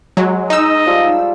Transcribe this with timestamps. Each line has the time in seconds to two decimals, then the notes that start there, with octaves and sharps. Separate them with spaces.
0.17 F#3 G#3
0.50 D#4 D#5 E6
0.86 F3 G3 F4